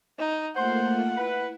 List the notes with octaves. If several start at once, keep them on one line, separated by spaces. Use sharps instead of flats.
D#4
A3 A#3 F4 C5 F#5 C6
E4 B4